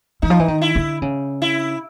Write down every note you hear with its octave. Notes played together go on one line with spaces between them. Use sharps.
E3 D#4
F3
E3
D#3
E4
D3
C#3
E4